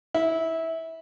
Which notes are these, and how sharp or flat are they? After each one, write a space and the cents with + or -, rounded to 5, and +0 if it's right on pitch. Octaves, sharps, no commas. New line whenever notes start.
E4 -20